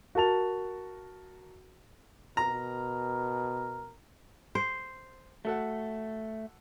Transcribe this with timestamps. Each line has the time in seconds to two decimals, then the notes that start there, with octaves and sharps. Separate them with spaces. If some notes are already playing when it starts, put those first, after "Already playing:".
0.15 F#4 A#4 A5 F7
2.37 B2 A#4 A#5
4.55 C5
5.45 A3 F#4 A4 F#5